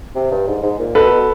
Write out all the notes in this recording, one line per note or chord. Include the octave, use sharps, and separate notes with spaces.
C3
G2
G#2
G#2
A#2
B2 A4 B4
B2